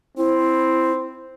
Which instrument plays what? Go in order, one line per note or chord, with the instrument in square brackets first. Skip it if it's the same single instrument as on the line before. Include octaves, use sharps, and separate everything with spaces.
[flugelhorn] C4 [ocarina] E4